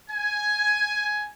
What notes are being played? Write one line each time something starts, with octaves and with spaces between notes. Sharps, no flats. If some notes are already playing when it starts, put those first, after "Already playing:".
G#5